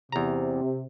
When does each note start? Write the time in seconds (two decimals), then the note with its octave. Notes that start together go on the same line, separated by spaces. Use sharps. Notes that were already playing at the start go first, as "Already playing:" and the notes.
0.12 E2 C3 A#5